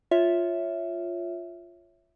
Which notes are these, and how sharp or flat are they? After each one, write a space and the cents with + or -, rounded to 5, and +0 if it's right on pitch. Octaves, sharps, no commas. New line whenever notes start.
F4 +0 C#5 +0 E5 +0